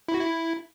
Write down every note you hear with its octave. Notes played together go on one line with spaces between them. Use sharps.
E4
F#4
E4